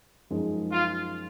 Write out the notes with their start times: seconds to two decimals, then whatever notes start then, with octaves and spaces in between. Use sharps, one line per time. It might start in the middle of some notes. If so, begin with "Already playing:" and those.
0.30 F#2 F3 G#3 D#4
0.72 F4